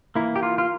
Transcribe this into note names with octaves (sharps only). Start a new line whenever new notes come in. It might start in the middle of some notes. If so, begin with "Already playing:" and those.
E3 A#3 E4
G4
F4
F4